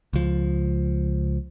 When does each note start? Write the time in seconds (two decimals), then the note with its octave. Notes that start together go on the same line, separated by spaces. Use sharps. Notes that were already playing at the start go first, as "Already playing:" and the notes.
0.13 C#2 F3